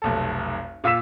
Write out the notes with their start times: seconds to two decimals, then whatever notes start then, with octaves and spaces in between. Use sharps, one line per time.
0.02 F1 B1 A4
0.84 A#2 F4 E6 B6 E7